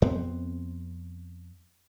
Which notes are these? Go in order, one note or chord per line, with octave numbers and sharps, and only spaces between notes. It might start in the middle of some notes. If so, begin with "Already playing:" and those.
F2 B3 C4